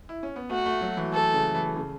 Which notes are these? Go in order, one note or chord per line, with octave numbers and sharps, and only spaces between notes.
E4
C#4
B3
A3 F#4
A3
F#3
E3
A4
C#3
E3
C#3